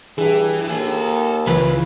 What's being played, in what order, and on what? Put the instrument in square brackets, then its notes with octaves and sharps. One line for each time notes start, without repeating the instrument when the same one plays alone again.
[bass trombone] G2 [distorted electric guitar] E3 [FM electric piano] G#4
[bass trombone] D#2 [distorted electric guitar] A4 G#5
[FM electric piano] C#2 [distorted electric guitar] C#3 [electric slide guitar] E3 F4 B4